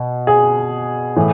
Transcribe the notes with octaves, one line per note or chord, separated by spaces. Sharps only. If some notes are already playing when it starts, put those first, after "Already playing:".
Already playing: B2
G#4
A2 E3